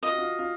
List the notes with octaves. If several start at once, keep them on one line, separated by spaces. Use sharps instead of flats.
F4 D#5
F#4
F4
F4